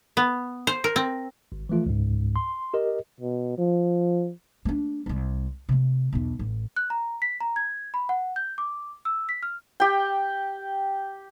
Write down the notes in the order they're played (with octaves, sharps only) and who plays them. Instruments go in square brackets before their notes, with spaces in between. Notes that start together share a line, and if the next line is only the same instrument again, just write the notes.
[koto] B3
C5
A#4
C4
[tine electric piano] G#1
E3 F3 A3 F4
C#2 G#2
C6
G4 A#4 D#5
[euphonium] B2
F3
[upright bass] A3 D4
D#1 C2
C3 A3
B1 E2
A1
[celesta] F#6
A#5
B6
A#5
G#6
B5
F#5
G6
D6
E6
B6
F6
[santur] G4 G5